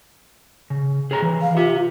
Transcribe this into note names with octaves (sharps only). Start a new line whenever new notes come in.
C#3
G#4 C#5 A#5
E3
F5
F4 G4 E5